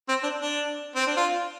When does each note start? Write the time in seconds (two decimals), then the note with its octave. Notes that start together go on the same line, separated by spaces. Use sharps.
0.09 C4
0.23 D4
0.40 D4
0.96 C4
1.07 D4
1.17 F4